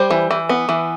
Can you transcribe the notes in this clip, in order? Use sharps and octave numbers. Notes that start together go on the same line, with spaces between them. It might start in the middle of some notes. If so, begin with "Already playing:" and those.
Already playing: G3 C5
E3
E3
B3
E3